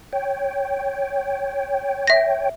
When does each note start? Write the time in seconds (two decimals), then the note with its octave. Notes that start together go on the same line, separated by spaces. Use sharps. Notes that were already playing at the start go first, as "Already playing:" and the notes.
0.13 C#5 G5
2.07 E5 A#6